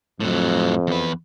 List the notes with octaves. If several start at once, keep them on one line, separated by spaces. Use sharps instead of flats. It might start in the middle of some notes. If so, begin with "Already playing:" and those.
F2 A2 F#3
E2 B4